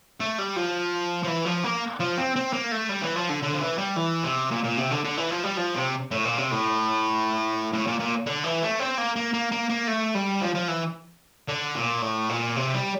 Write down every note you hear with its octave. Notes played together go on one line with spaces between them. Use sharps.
A3
G3
F3
F3
E3
F3
A#3
F3
C4
C4
A#3
A3
G3
E3
F3
D3
D3
F3
E3
G3
E3
C3
A#2
A#2
C3
D3
D3
E3
F3
G3
F3
C3
A2
A#2
C3
A2
A2
A#2
A#2
D3
E3
A3
C4
A#3
A#3
A#3
A#3
A#3
A3
G3
F3
F3
E3
D3
A#2
A2
A#2
C3
G3